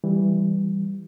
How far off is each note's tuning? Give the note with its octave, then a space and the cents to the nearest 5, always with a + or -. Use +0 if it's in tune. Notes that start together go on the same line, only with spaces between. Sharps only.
E3 +0 G3 +0